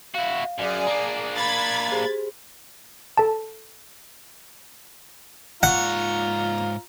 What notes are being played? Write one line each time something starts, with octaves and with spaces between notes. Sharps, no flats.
E4 F#4 F5
F#2 G#4 D5
A#3 D4
B5 G#6 A6
G4 G#4 C5
A4 A5
G#2 F4 C#5 F#5 A#5